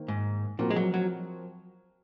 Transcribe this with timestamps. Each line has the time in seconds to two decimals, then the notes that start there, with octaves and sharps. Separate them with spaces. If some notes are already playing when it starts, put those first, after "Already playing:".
Already playing: D#3 A#3 C5
0.08 G#2
0.59 A#2 F3 C4 F#4 A#4
0.70 G#3
0.76 F#3
0.94 F#3